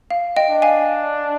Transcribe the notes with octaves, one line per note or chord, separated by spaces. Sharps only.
F5
D#5 G5
D4
F5 G#5